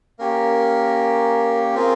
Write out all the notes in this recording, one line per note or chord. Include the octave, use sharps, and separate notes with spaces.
A#3 C#4 G4 A#4
C4 F4 G#4 A#4